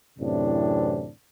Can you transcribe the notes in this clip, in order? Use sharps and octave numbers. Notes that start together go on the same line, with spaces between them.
F#2 A2 C3 E3 C4 D4